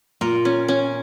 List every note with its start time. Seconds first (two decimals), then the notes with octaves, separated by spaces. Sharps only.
0.21 A#2 A#4
0.45 C#4
0.68 C#4